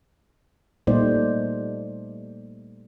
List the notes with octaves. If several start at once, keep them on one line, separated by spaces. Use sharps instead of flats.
A#2 G3 A3 D#4 C5 D5